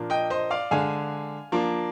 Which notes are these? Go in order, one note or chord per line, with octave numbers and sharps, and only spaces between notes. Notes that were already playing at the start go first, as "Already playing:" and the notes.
Already playing: A#2 F3 A#3 D4
D#5 G5
C5 D#5
D5 F5
D3 G#3 D4 F5 G#5
F3 A#3 D4